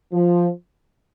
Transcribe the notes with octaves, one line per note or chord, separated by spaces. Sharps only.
F3